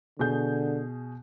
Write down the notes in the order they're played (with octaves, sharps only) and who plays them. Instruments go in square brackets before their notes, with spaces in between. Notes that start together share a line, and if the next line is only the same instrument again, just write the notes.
[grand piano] B2 G#4 G6 [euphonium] D3